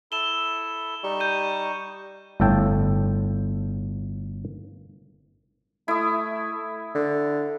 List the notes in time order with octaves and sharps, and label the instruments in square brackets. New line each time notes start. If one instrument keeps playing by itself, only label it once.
[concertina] E4 A4 [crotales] E7 G7
[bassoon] G3 [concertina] D#4 C#6
[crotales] G6 D#7
[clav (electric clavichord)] G1 A2 A4 G5 A5
[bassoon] A3 [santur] E4 D#6
[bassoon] D3